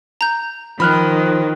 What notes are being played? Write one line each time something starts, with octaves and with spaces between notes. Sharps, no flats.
A#5 G6
D#3 F3 B5 F6 F#6